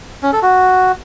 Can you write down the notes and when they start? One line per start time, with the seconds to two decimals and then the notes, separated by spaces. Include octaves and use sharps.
0.23 C#4
0.33 A4
0.42 F#4